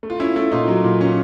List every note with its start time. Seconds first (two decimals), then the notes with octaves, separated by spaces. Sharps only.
0.03 A3
0.10 F4
0.20 C#4 E4
0.36 A3 E4
0.51 A#2 D#4 F4
0.68 F#3
0.84 A#2
1.01 C#4